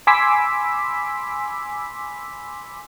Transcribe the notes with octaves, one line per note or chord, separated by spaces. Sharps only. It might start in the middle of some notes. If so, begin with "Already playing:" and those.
G#5 B5 C6 D6 E6 B6